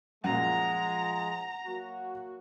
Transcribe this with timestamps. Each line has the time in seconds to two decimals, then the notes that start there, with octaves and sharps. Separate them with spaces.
0.24 F#2 A#2 F3 G#3 F#5 A#5
1.67 F#3 A#3 F#4